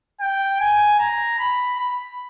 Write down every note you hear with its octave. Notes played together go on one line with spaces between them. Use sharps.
G5
G#5
A#5
B5
B5